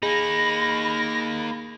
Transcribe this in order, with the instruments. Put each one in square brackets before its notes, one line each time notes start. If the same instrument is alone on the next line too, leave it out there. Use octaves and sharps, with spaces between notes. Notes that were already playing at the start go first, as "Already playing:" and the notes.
[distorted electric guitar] A#3 D#4 [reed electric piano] G#4 [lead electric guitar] B5 [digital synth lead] A#6